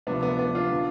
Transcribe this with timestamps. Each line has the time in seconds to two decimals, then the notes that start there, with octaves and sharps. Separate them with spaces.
0.07 D2 C3 F3 B3 D4
0.23 B3
0.39 B3 D4
0.55 D4 F4
0.71 D3 F3